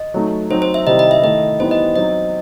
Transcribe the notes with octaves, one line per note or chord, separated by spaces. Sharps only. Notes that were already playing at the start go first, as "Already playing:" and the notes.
Already playing: D#5
F#3 A3 D#4
F#3 C4 D#4 C5
C5
E5
C3 D#3 G3 C4 E4 D#5
D#5
E5
D#3 A3 E4 D#5
E3 G3 B3 D#4 C5
D#5
F#3 C4 D#4 D#5